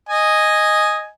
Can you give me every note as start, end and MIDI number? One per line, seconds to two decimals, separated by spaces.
0.09 1.08 75
0.09 1.08 80